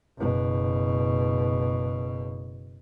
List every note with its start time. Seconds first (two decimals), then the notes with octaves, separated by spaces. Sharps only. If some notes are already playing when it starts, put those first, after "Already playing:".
0.19 F#1 B2